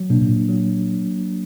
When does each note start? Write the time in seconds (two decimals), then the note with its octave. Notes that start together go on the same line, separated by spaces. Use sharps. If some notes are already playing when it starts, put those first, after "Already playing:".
Already playing: F#3
0.10 B2 A#3 D4
0.21 B2
0.29 A#2
0.48 F#3